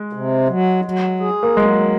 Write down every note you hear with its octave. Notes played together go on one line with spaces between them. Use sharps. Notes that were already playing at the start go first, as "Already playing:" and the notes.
Already playing: G#3
C3
F#3
F#3
G#4
A#3
F#3 G#3